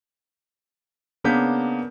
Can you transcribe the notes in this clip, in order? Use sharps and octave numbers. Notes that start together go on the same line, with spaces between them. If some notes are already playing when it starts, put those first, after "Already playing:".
C#3 A#3 B3 D4 G6 B6